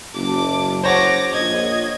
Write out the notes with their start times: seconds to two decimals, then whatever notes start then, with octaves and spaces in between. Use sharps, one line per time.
0.14 F#1 A5 D6
0.84 C5 C#5 F#5 D6 A#6
1.33 A#1 D#5 G#6